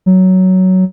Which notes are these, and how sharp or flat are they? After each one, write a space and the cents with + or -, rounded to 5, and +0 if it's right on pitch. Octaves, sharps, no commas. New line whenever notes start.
F#3 +10